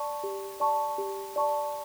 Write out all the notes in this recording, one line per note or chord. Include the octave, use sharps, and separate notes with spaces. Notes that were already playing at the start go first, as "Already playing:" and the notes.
Already playing: D5 A5 C#6
G4
D5 A5 C#6
G4
D5 A5 C#6